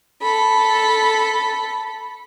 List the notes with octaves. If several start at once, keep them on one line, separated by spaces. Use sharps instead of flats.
A4 B5